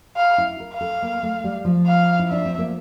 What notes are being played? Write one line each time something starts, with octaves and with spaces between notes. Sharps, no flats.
F5
E4
A#4
F5
A4
A#3
A3
G3
F3
F5
E4
D4 E5
C4
A#3